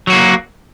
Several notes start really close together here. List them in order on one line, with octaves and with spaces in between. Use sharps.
F#3 F#4 A#3